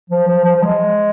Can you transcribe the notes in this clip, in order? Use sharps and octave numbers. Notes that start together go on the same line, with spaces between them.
F3
F3
F3
F3
G#3